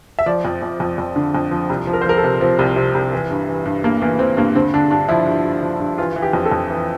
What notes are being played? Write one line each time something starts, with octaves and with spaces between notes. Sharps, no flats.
E5
F3 D5
F2
F2
F2
F2
D3
F2
F3
C2
F3
A#4
C5
F3 A#4
A4
C3
F3 C4
C2
C3
C2
E3
G2
E3
G2
G2 A#3
E3 A#3
E3 C4
G2 A#3
D3 C4
D3 D4
G2 D4
F3 E4
G2
G2
F3
G2
E3 F4
E3
G4
F2
A4
F2
E3